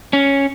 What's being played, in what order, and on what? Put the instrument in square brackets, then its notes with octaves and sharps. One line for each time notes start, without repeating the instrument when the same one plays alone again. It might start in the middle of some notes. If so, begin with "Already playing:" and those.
[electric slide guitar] C#4